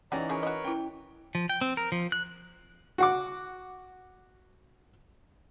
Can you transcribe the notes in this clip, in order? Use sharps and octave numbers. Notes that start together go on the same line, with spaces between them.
C#3 E3 C#4 D#4 G4 D5 F#5 A#5
C#3 F3 G#4 A#4 B4 C#5
F#4 D#5
C#4 E4 G5
F3
G5
C4
A#4
F3
F#6
F#4 F#5 D6